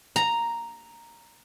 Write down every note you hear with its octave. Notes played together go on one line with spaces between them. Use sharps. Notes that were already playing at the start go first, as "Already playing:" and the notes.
A#5